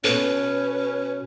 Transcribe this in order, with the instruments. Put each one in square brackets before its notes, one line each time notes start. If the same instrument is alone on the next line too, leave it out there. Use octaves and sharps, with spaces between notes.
[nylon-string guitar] B2 A4 [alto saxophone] C#4 [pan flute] B4